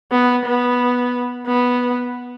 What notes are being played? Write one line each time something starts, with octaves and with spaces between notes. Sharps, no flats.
B3
B3
B3